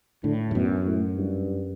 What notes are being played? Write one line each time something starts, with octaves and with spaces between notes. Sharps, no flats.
A2 D3
G2
F#2 B2
A2
G2